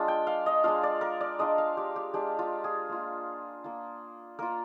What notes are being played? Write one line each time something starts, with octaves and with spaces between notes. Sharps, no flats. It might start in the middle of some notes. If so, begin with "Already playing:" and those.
Already playing: G#3 D4 F4
G5
F5
D#5
G#3 D4 F4 F5
D5
A#4
D5
G#3 D4 F4 D#5
F5
G4
G4
G#3 D4 F4 G4
F4
G#4
A#3 F4
A#3 F4
A#3 F4 A#4